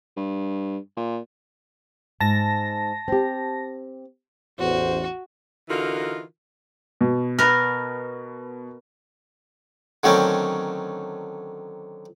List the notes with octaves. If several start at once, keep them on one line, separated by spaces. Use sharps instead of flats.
G2
A#2
G#2 A5 A#6
C4 G4
A1 E2 F#4 C5
D3 E3 D#4 F4 F#4 A#4
B2
B3 A#4
D3 D#3 F#3 A3 C4 C#4